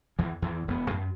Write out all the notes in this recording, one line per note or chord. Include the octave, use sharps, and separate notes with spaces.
E2 E3
E2 E3
E1 B3
F#2